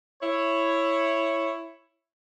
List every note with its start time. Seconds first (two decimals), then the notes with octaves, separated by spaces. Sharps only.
0.22 E4 C#5